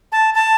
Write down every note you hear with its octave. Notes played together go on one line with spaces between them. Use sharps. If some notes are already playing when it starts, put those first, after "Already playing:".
A5
A5